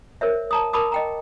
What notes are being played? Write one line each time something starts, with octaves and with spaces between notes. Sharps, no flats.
A#4 C5 C#5 E5
A5 A#5 D#6
A#4 A5 B5 D6 D#6
D#5 G5 A#5